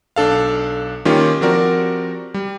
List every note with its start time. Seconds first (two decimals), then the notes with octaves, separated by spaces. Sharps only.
0.16 B1 D4 A4 F5
1.05 D#3 G3 A#3 C#4 F4 G4
1.41 F3 C4 F#4 G4 A#4 D5
2.34 G3